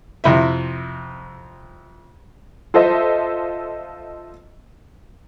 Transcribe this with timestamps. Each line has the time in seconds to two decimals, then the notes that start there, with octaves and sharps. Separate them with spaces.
0.24 F2 C3 E4 E5
2.74 F4 A4 C5 D#5 E5